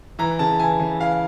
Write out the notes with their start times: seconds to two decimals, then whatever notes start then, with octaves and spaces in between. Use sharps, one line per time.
0.19 E3 A#5
0.39 C#3 A5
0.59 E3 G#5
0.80 C#3
0.99 E3 F5